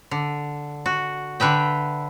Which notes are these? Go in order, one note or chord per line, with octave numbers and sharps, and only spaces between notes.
D3
F#4
D3 B4 E5 G5